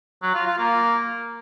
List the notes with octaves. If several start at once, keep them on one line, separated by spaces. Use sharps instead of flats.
F#3
F4
F4
A#3